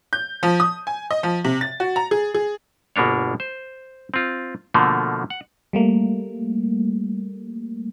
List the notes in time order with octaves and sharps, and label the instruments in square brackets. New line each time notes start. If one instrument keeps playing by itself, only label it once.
[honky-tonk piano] G6
F3
D#6
G#5
D#5
F3
C3
A6
F#4
A#5
G#4
G#4
[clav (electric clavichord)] G1 B2 A#3 D4 C#5
C5
C4 F4
B2 D3 F3 A3 A#3
F#5
[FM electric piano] G3 A3 A#3